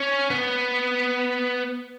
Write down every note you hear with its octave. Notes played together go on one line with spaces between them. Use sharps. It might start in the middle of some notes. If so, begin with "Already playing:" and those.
Already playing: C#4
B3